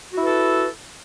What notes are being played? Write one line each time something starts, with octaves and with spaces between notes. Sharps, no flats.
E4 F#4 A4 B4